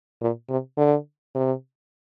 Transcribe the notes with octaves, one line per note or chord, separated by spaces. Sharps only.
A#2
C3
D3
C3